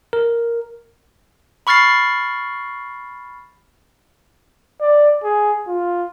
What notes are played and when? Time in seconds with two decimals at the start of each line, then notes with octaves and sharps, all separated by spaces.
0.13 A#4
1.67 B5 C#6 F6 A6 C7
4.81 D5
5.24 G#4
5.68 F4